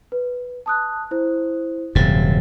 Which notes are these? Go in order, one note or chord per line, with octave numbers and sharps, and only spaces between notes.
B4
A5 D#6 F#6
E4 C5
D#1 F#2 C3 A6